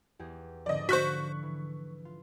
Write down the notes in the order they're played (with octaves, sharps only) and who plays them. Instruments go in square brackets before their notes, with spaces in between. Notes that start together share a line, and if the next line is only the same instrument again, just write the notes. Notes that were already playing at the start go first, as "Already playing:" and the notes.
[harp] E2 G4 G#4
[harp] G#2 D3 F3 [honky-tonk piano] D5 D#5
[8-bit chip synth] F#4 C5 [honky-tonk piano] C#6 F#6 B6
[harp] E3
F4